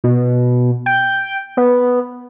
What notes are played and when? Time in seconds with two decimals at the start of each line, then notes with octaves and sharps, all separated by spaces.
0.04 B2
0.86 G5
1.57 B3